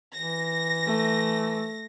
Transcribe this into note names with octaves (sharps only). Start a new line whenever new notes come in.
E3 A#6
A3